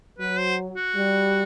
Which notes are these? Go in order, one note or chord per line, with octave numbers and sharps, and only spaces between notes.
F#3 B4
C5
F#4
G3